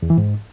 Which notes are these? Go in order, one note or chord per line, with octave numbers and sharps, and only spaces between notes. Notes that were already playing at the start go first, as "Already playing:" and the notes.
E2
E3
G#2